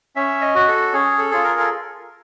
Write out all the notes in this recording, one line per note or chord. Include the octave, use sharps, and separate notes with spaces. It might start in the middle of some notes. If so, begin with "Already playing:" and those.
C#4 E5
D#5
F#4
A4
C#4 G#4
A4
F4 G#4
A#4
A4